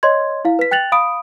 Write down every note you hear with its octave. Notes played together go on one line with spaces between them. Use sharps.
C#5 D#5 C6 G#6
E4 F5
B4 B6
G5 F#6 A6 F7 F#7
F5 B5 D#6 D7